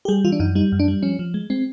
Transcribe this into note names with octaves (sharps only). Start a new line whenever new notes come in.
G4
G3 G#4
E3 F4
D4
F#2 D#4
G3 D#4
F#2
D4
G3
F3 C#4
F3
G#3
G#3 C4